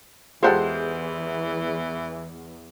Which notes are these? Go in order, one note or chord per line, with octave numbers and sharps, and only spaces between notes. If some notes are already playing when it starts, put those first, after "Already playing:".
E2 E3 G#3 F4 G4 A4 C5 F#5